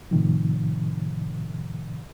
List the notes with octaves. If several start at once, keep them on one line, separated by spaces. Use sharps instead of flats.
A2 C3 D#3 F3